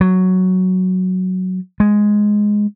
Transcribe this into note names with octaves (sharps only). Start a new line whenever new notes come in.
F#3
G#3